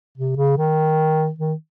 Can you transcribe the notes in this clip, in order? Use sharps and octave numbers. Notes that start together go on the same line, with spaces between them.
C3
C#3
D#3
D#3